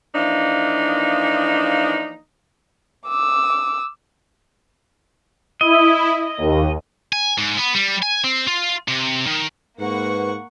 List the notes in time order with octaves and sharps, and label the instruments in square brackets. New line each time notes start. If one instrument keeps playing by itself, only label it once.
[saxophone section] E3 F3 A#3 D4 D#4
[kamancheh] D6 E6
[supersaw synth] E4 [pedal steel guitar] D#5
[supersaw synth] D#2
[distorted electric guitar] G#5
G#2
B3
G3
G#5
C4
F4
C3
D#3
[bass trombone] G#2 [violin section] A#3 F#5 C#6 [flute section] B4